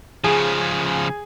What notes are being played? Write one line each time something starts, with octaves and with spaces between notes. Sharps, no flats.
C#3 F3 G#4